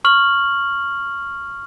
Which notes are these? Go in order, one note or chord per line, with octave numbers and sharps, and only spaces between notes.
C#6 F6 F#7